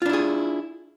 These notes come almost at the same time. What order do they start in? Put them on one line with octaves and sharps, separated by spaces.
F4 D4 E4 G#4